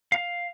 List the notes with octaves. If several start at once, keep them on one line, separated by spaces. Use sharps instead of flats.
F5